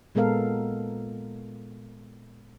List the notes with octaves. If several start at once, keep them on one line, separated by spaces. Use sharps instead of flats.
A#2 G#3 B3 A4 A#4 F5